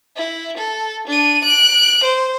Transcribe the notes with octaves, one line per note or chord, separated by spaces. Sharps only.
E4
A4
D4 D#7
F#6 D7
C5